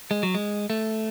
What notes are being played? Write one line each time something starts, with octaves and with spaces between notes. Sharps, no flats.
G#3
F#3
G#3
A3